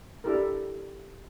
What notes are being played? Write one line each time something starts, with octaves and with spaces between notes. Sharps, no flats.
D4 E4 G4 A4 A#4